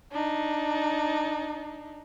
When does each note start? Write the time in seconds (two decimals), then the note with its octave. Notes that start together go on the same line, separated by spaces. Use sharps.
0.12 D4 D#4